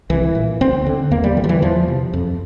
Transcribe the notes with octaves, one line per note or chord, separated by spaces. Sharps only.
C2 E3
A#2
D2 C4
D3
E2 A#3
G3
D3 E3
F3
E3
E2 F3
C3
F2